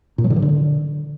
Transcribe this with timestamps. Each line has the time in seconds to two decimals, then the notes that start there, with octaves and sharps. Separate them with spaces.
0.18 A#2
0.24 F#3
0.30 D3
0.36 E3
0.42 D3